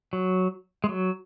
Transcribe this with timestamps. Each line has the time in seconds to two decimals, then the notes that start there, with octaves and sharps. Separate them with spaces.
0.13 F#3
0.84 G#3
0.89 F#3